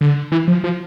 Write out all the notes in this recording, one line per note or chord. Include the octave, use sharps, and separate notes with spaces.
D3
E3
F3
F3